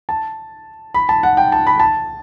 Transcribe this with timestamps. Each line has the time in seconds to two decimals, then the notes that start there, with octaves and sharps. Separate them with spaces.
0.09 A5
0.94 B5
1.09 A5
1.23 F#5
1.37 G5
1.52 A5
1.67 B5
1.80 A5